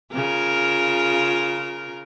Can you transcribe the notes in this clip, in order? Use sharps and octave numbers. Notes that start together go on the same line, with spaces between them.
C#3 F4 A#4